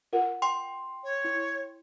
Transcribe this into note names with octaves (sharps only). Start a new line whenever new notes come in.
F4 A#4 F#5
G5 C6
C#5
E4